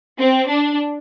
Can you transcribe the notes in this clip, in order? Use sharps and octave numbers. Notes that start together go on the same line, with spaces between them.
C4
D4